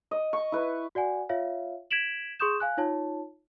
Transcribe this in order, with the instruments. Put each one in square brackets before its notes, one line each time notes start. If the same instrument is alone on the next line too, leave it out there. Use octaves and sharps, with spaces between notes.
[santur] D#5
C#6
E4 B4
[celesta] F#4 D5 F#5 G#5
F4 C#5 E5 F5
G#6 B6 D7 E7 F#7
G#4 C6 C#6 D#6 G6 E7
F5 G#5 F#6
D#4 F4 C#5 A5